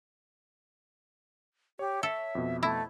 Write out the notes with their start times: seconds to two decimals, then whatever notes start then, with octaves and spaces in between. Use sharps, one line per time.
1.79 G4 C#5
2.03 A4 E5
2.35 F2 B2
2.63 A3 E4